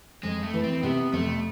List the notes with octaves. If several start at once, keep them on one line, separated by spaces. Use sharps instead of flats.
F2 G#3
A3
E3
C4
C3 B3
F2 A3